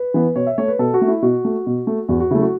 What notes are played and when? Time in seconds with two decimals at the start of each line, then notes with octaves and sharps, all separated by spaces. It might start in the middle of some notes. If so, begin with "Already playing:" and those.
Already playing: B4
0.14 E3 B3
0.36 B2 C#5
0.47 E5
0.58 A3 C#5
0.68 B4
0.79 B2 A4
0.94 F#4
1.01 A3
1.08 E4
1.22 B2 F#4
1.45 A3
1.67 B2
1.87 A3
2.09 E2 F#4
2.20 F#4
2.31 C#3 F#3 A3 E4
2.42 F#4